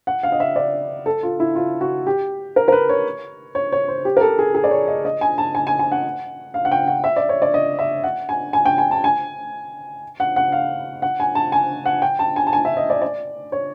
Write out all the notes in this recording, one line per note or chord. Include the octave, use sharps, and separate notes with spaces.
F#5
F5
D#5
E5
D5
A4
F4
E4
F4
F#4
G4
A#4
A#4
B4
C#5
C#5
C#5
C5
G4
A#4
A4
G#4
G#4
D5
C#5
D#5
D#5
G#5
A5
G#5
G#5
G#5
F#5
F5
F#5
G5
F#5
E5
D5
C#5
D5
D#5
E5
F#5
G#5
G#5
G5
G#5
A5
G#5
F#5
F#5
F5
F#5
G#5
A5
G#5
F#5
G5
A5
G#5
A5
G#5
E5
D#5
D5
D5
C#5